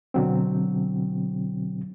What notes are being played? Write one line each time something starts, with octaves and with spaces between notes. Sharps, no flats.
B2 D3 F#3 C4